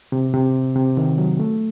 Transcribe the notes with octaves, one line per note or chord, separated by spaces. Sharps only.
C3
C3
C3
D#3
F#3
A3